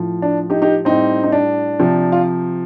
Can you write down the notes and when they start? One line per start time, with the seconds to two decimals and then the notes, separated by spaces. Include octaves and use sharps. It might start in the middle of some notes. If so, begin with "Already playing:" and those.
Already playing: A2 F3
0.22 D4
0.50 D#4 G4
0.62 D#4 G4
0.85 A2 G3 C4 D#4
1.24 D#4
1.32 D4
1.80 C3 F3
2.12 F4